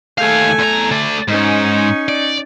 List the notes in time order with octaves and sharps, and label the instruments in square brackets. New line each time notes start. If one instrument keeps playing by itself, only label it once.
[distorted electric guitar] D#2 F5 [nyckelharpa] A3 G#5
[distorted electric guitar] E2 A#5
A3 D5
[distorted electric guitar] G#2 [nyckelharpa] C#4 D#4
[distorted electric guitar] D5